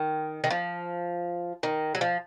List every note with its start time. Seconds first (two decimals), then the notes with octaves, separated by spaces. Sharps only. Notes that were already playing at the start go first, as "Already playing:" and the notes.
Already playing: D#3
0.44 D#3
0.50 F3
1.63 D#3
1.95 F#3
2.01 F3